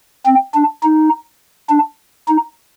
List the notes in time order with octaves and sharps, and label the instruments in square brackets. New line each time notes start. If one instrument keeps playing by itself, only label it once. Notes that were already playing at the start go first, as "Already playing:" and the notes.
[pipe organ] C4
D4
D#4
D4
D#4